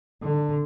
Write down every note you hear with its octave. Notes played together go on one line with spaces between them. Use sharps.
D3